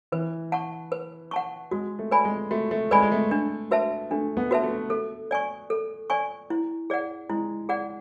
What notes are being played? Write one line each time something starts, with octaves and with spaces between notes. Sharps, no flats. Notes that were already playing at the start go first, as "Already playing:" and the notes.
E3 B4
F#5 A5 C#6
B4
F#5 A5 C#6
G#3 F#4
A3
B4 D5 G#5 B5
G#3
A3 F#4
A3
G#3 B4 D5 G#5 B5
G#3
A3
A3 D4
F#4 B4 E5 A5
A3 D4
B3
F#4 B4 E5 A5
A3
A4
D5 G#5 C#6
A4
D5 G#5 C#6
E4
G#4 D5 F#5
G#3 E4
G#4 D5 F#5